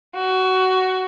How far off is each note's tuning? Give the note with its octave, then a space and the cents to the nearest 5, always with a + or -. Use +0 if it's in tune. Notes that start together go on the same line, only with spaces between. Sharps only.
F#4 +15